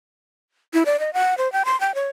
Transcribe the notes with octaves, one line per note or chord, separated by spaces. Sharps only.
E4
D5
D#5
F#5
C5
G5
C6
G5
C#5